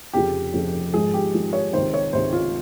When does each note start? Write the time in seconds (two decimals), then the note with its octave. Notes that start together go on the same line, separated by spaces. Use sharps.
0.13 F1 F2 C#3 F3 G4
0.53 F1 F2 C#3 F3
0.94 G#1 G#2 F3 G#4
1.14 G4
1.34 G#1 G#2 F3
1.53 C#5
1.73 C#2 C3 D#3 C5
1.94 C#5
2.13 C#2 C3 D#3 C5
2.33 F4